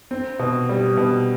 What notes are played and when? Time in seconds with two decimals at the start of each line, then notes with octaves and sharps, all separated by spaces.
0.11 C4
0.39 B2
0.69 G3
0.97 B2